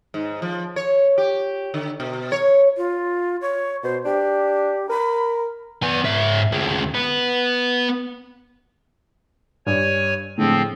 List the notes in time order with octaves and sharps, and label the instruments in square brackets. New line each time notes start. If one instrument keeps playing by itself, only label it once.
[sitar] G#2
F3
C#5
G4
D3
B2
C#5
[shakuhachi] F4
C#5
[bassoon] B2 [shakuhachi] C5
[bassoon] D4 [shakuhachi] G4
[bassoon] A#4 [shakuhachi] B5
[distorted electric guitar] B3 G#5
G#2 E5
D2 G#3
B3 B4
[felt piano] G2 [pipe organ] C#5 G#5
[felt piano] A2 D3 G#3 [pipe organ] F3 C4